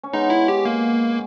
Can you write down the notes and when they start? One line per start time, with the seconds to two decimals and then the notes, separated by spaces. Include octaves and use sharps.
0.03 C#4
0.13 G#3 B3 D#4
0.30 E4
0.48 G4
0.65 A#3